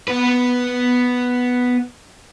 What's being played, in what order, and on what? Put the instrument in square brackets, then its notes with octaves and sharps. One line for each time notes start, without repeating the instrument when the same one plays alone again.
[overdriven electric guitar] B3 B4